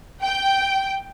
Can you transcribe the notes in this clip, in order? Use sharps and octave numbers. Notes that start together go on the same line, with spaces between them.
G5